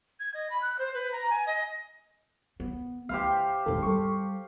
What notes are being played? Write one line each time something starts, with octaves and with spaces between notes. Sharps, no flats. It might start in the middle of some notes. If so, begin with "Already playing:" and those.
G#6
D#5
B5
F#6
C5
B4
A#5
G#5
D#5
B3
D2 G4 C5 F5
G#1 D#2 A4
G3 A4 C#6